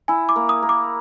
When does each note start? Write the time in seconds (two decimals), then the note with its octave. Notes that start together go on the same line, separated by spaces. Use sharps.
0.08 E4 G#5
0.29 D6
0.36 A#3
0.49 D#6
0.62 A#3
0.69 D6